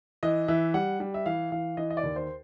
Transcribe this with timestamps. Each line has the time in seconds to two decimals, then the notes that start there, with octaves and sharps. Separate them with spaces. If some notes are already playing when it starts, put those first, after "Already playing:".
0.23 E3 D#5
0.48 E3 E5
0.74 G3 F#5
1.00 G3
1.14 E5
1.26 E3 F5
1.52 E3 F5
1.77 E3 D#5
1.90 D#5
1.97 D5
2.03 D#2
2.16 C5